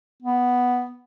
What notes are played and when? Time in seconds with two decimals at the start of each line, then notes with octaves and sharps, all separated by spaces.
0.22 B3